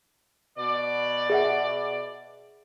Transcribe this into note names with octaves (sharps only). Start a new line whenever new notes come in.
B2 D5
G#4 E5 F#5